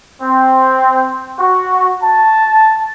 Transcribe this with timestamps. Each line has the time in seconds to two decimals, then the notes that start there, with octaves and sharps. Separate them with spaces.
0.21 C4
1.39 F#4
2.02 A5